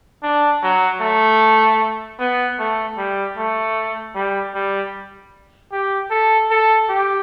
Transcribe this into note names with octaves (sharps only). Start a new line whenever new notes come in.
D4
F#3
A3
B3
A3
G3
A3
G3
G3
G4
A4
A4
G4